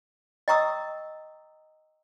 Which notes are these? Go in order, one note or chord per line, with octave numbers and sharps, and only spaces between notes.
D#5 G5 A#5 C#6 D#6 E6